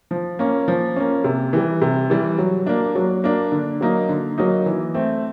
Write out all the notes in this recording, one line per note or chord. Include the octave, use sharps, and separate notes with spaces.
F3
A#3 C#4
F3
A#3 C#4
C3
E3 G3
C3
E3 G3
F#3
A#3 D4
F#3
A#3 D4
D3
F#3 A#3 D#4
D3
F#3 A#3 D#4
E3
A3 C4